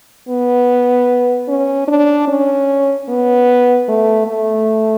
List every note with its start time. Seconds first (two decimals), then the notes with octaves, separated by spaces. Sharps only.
0.29 B3
1.48 C#4
1.88 D4
2.28 C#4
3.08 B3
3.89 A3
4.27 A3